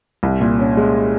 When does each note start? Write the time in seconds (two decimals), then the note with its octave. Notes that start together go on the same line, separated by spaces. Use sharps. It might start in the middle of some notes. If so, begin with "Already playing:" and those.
0.23 C2
0.41 A#2
0.59 C#4
0.77 G#3